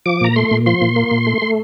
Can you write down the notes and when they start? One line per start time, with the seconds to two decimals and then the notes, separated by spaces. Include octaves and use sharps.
0.06 F3 D6
0.21 A#2 A#5
0.36 A3 C6
0.51 A#2
0.66 F3 C6
0.81 A#2
0.96 A#3
1.11 A#2
1.27 A3
1.42 A3